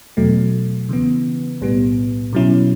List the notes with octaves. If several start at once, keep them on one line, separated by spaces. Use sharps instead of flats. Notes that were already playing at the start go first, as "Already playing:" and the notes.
E2 B2 F#3 A3
C#3 E3 B3
B1 A2 G3 B3
B2 F#3 C#4 E4